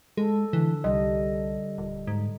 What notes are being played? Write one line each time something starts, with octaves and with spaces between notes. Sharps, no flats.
G#3 A4
D3 E3
C2 G3 D#5
D#1
G#2